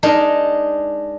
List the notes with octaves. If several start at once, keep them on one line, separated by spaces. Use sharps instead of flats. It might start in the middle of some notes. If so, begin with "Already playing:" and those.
G#3 D4 D#4 A#4